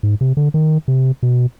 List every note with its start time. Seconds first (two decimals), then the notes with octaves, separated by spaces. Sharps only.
0.03 G#2
0.21 C3
0.37 D3
0.54 D#3
0.88 C3
1.23 B2